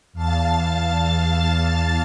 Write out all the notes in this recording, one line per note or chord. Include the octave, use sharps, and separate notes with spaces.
E2 F5 A5 A6